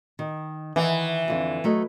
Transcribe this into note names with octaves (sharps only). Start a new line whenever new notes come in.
D#3
D#3 E3 E4 F#5
F2 D3
F#3 A3 D#5